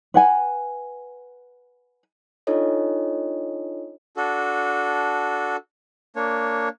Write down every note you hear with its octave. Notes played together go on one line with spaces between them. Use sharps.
B4 F#5 G#5
D4 D#4 F4 A4 C#5 D#5
D4 F#4 A4
A#3 D4 C#5